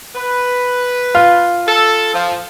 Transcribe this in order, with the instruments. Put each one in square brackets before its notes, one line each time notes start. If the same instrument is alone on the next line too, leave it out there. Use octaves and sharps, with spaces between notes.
[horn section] B4
[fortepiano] F4
[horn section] A4
F3